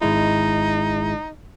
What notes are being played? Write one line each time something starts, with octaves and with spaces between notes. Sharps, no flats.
G#1 G#3 D#4 E4